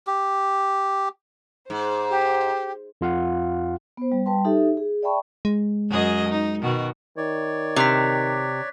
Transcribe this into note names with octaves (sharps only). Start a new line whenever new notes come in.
G4
G#2 C5
G4
F2 F4 F5 F#5
B3 C5
G3
G3 B4 G5 A5 C6
D#4 G4 A4 E5
G#4
D5 E5 G5 A5 B5 C#6
G#3
F#2 G#4 D#5
D#4
B2 D#3 F#4
D#3 C#5 D5
C3 D6 F#6 B6